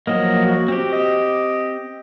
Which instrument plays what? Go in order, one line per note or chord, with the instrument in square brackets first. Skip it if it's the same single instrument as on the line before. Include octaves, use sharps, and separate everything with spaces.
[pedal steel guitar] F3 F#3 A#3 [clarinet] D#5
[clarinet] F#4
[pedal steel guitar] C4 G4
[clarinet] D#5